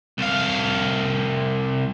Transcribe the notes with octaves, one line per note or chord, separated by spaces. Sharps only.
C2 F5